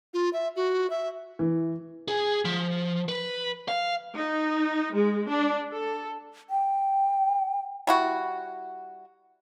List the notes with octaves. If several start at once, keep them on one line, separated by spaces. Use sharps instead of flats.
F4
E5
F#4
E5
E3
G#4
F3
B4
F5
D#4
G#3
D4
A4
G5
G3 E4 F#4